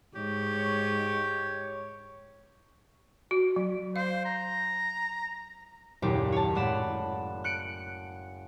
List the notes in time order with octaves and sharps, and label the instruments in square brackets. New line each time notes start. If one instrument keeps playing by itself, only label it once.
[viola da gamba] G#2 [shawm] G4 [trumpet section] C#5 C#6
[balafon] F#4
F#3
[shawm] C5 [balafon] F5
[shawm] A#5
[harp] F#1 D#2 A#2 D4 G4
C#5 A5
A2 G#3 D5 F#5 B5 E7
F#6 C#7 D7